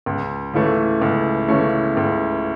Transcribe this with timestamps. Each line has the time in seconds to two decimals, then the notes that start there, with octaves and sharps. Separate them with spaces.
0.06 C#2
0.54 C#3 E3 A3 C#4
1.02 C#2
1.48 C#3 E3 A3 C#4
1.97 C#2